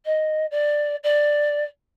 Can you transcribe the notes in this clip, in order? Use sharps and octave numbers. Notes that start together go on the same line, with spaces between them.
D#5
D5
D5